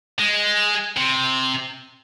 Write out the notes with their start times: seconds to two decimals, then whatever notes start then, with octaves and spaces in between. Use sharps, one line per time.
0.19 G#3
0.97 C3